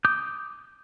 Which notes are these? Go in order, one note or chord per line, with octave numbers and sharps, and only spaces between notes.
D6 D#6 G6